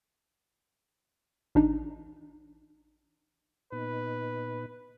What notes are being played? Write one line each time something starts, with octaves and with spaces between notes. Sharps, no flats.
A1 D4 D#4
A#2 B3 D#4 B4